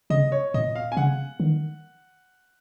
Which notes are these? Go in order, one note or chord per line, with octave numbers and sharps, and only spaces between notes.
C#3 D#5
C#5
A#2 D#5
F5
G#5
C#3 F#5
D#3